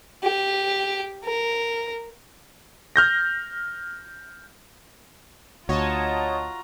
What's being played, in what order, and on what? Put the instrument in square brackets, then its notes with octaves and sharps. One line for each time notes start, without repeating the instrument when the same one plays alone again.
[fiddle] G4
A#4
[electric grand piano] F6 G6 A#6
[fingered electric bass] D2 [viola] F4 A#5 [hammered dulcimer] F#4 [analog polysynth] C#5 D#5 A5